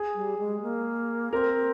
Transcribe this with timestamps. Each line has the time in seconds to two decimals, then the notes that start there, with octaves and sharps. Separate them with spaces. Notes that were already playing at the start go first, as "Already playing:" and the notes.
Already playing: G#4
0.15 G3
0.39 G#3
0.62 A#3
1.33 C4 A#4